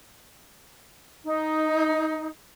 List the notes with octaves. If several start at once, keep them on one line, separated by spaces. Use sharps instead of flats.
D#4